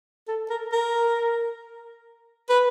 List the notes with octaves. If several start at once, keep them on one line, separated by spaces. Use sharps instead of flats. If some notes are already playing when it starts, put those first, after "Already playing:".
A4
A#4
A#4
B4